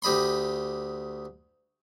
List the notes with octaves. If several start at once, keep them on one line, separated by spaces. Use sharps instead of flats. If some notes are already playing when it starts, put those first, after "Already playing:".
D2 G4 D#5 B5 C6